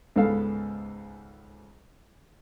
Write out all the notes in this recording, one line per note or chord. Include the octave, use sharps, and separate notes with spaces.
C#2 G#2 B3 A4 F5